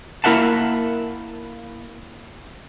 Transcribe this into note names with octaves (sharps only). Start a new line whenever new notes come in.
A#3 E4 A#4 E5 F#5 A5